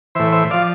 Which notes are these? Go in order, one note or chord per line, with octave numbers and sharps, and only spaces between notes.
A2 E3 C5 E5
C5 E5
F3 D5 F5